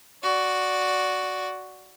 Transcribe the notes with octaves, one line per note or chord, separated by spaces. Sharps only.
F#4 D5